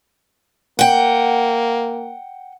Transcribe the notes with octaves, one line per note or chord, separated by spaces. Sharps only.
A#3 F#5 G5